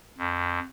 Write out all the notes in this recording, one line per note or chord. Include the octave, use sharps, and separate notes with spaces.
F2